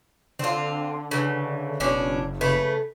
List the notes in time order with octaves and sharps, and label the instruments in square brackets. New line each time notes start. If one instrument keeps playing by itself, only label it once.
[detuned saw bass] D3 [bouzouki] C4 F4
[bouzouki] C#3 E3
[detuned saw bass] F#1 [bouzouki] B2 C#4 D4
[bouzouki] C#3 A3 B4